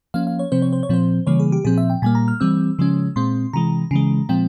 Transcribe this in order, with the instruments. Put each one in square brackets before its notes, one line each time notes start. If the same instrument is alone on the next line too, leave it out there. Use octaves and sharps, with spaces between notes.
[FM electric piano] F3 A#3 C#4 F5
F5
C#5
C3 F3 C4 C5
C#5
C5
C#5
A#2 F3 C4 C5
C#3 E3 G3 A#3 C#5
G#4
G4
A#2 F3 C4 G#4
E5
G5
A#2 G3 A#3 G#5
A#5
F6
E3 G3 C4 E6
C#3 F3 G#3 C#4
A#2 G#3 C4 C6
C3 E3 G#3 A#5
C#3 E3 G#3
A#2 F3 G#3 C4 G5